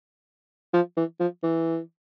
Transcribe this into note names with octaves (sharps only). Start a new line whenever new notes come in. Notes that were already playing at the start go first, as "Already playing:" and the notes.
F3
E3
F3
E3